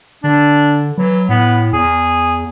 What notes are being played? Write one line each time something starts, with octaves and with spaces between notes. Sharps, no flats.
D3 D4
E3 F#3
A2 B3
E2 G#4